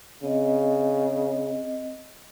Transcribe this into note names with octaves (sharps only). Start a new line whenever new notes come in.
C#3 C4 D#5